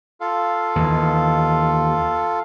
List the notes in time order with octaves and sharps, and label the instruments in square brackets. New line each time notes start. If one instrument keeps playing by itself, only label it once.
[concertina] F4 A4 F5
[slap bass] D#2 E3